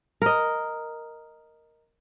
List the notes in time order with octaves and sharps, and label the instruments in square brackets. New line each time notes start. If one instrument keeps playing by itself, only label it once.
[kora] A#4 D#5